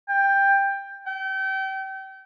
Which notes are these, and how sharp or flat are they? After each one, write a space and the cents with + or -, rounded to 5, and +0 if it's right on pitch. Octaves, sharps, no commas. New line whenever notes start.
G5 +10
G5 -35